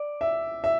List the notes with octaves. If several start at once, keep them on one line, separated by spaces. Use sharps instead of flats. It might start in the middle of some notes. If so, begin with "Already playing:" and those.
Already playing: D5
E5
E5